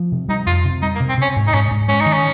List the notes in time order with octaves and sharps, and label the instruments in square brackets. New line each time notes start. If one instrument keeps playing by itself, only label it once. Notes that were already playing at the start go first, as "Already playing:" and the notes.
Already playing: [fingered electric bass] F3
C3
[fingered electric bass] G3 [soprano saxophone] D#4
[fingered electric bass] F2 [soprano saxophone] F4
[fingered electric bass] C3
[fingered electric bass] G3 [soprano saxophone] D#4
[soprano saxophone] A#3
[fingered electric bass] C3
[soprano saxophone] C4
[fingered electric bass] C3 [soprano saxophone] C#4
[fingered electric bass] G#2
[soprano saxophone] D#4
[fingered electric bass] G#2 [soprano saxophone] C#4
[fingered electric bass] G#2
[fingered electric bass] G#3 [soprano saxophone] C#4
[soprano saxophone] D#4
[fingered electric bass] D#3
[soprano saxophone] C#4